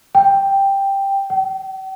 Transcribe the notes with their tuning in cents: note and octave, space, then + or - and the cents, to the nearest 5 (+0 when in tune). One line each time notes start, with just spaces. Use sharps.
G5 +5
G5 -45